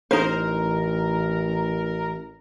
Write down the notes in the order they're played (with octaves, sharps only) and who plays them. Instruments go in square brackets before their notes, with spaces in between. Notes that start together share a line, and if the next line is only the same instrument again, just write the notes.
[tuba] A1 [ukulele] D#4 C5 [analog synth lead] A#4